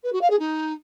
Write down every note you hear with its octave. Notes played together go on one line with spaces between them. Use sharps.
B4
F#4
F5
G#4
D#4